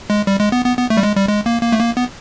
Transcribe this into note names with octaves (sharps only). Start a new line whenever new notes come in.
G#3
G3
G#3
B3
B3
B3
A3
G3
G#3
G3
G#3
A#3
A#3
A3
A#3
B3